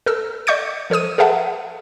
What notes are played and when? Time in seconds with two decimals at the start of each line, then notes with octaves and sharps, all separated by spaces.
0.06 A4 A#4 E6
0.47 D5 D#5 C#6 G6 C#7
0.90 F3 A4 C5 D#6 D#7
1.18 G#4 A4 B4 E5 F#5 A5